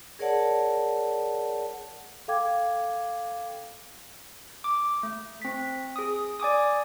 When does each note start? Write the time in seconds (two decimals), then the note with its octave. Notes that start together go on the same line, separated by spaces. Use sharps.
0.19 G#4 A#4 C#5 D5 F#5 A5
2.28 A4 F5 G5 D6 G#6
4.64 D6
5.03 A3
5.42 C4 B6
5.96 G#4 D#6
6.40 D5 G#5 D6 D#6